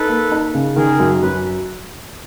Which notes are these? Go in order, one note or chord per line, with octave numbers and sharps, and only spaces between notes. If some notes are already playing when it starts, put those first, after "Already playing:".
Already playing: D#4 A4 B4
A#3
D#4
C#3
D#3 G#4 A#4
F#2
F#2 B4